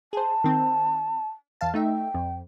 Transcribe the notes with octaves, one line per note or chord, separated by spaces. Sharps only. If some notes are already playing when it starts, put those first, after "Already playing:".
G#4 C5 A5
D#3 C4
E2 F5 A5
A3 D#4 E5 G5
F2